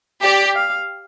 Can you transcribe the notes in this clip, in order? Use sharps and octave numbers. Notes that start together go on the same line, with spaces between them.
G4 D5
F5